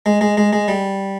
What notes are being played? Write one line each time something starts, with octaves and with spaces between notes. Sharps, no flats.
G#3
G#3
G#3
G#3
G3